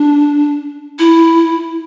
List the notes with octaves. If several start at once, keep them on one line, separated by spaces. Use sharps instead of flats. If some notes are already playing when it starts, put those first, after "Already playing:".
Already playing: D4
E4